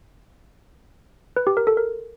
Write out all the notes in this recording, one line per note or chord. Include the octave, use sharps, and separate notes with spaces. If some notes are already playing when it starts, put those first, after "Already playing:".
B4
G4
A#4
A4
A#4